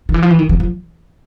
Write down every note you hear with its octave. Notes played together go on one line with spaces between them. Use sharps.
D#3
E3
F3
E3
D#3
E3
F3